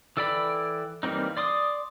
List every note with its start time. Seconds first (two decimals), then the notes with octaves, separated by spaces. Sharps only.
0.17 E3 A4 D5 G5 B5
1.03 E3 G3 A#3 C4 D#4
1.37 D5 C6 D6 D#6